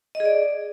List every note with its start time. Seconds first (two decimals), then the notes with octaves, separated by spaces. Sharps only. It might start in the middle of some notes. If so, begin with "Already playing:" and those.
0.15 D#5
0.20 G#4
0.25 D5